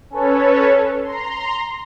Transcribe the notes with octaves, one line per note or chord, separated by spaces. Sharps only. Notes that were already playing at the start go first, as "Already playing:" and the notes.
C#4 A4 B4 C#5
A#5 C6